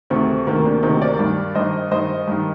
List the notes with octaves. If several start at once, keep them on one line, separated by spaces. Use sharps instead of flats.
D2 C3 D#3 A3 C4
D2 C3 D#3 A#3
A#3 D4
D2 C3 D#3 C4 D#4
A#4 D5
G2 D#3
G2 D#3 C5 D#5
G2 D#3 C5 D#5
G2 D#3